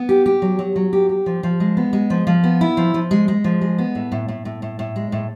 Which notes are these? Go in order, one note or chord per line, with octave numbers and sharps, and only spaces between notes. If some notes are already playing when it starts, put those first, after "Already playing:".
Already playing: B3
G4
G4
F#3
F#3
F#3
G4
G4
F3
F3
G#3
B3
G#3
F3
F3
B3
E4
F3
F3
G#3
G#3
F3
G#3
B3
A2
A2
A2
A2
A2
A2
G#3
A2